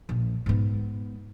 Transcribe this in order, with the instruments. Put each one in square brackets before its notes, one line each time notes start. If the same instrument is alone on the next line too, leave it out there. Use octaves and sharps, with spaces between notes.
[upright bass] A#1
G#2 B3